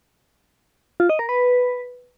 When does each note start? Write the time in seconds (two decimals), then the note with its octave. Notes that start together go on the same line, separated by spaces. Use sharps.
1.00 F4
1.10 D#5
1.19 A#4
1.29 B4